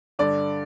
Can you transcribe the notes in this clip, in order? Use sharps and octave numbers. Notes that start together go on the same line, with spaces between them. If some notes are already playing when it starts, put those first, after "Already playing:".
G2 D3 D5